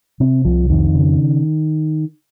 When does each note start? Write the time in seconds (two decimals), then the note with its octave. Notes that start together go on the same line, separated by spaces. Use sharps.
0.20 C3 C4
0.45 C2 F3
0.70 F2 D#3
0.95 C#3